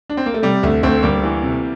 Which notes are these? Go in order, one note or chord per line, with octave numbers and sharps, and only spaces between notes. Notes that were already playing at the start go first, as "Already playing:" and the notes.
D4
C4
A#3
A3
C3 G3
D2 A3
D2 A3 C4
D2 G3 A#3
E3
C3